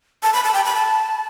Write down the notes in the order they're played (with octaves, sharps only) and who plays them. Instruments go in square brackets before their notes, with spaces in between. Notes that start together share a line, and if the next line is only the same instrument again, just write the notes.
[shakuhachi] A5
B5
A5
G5
B5
A5